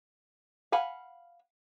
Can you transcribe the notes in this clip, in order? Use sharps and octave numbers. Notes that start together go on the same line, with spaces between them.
F5 F#5 G#5 B5